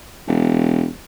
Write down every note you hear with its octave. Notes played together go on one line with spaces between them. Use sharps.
E1